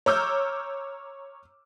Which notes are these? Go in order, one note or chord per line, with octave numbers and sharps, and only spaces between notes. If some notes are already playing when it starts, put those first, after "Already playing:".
C#5 A#5 D6 E6 F6 G6